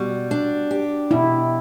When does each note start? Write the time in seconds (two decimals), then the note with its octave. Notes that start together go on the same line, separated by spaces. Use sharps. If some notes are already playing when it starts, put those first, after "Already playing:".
Already playing: B2 G3 F#4
0.31 D4
0.71 G4
1.11 B2 E4